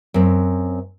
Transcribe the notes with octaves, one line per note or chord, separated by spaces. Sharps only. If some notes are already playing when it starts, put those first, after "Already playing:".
F#2 C4